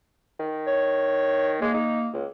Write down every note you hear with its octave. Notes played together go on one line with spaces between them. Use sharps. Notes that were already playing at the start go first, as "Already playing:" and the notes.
D#3
C#5
G#3 A#3
D#4
C#2